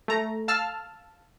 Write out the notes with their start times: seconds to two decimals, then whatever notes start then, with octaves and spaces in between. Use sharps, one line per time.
0.08 A3 A#5
0.48 F5 A5 E6 F6